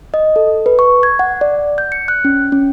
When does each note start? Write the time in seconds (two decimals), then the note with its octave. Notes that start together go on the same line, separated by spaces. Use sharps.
0.14 D#5
0.36 A4
0.66 B4
0.79 C#6
1.03 G#6
1.19 F#5
1.41 D5
1.78 G6
1.92 C#7
2.08 F#6
2.25 C#4
2.52 C#4